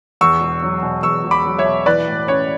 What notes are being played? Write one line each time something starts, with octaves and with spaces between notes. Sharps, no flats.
E2 C#6 E6
E1
F#3
B2
E2 C#6 E6
E1
B5 D6
F#3
C#5 E5
B2
E3 B4 D5
A2
C#4 C#5